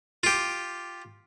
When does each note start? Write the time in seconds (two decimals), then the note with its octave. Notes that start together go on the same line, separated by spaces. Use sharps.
0.23 F4 G4